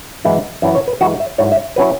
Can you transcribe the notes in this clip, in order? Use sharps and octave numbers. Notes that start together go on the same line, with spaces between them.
F#2 E3 G#3 E4
F#2 E3 C#4 E4 E5
C#5
B4
F#2 E3 G#3 E4 F#4
E5
G#2 F#3 E4 C#5
E5
F#3 C#4 E4 B4